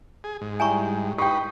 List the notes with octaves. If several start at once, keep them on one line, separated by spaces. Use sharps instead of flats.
G#4
G#2
G3 E4 G5 G#5 A#5 C#6
D#4 G4 B4 G5 C#6 D#6 G6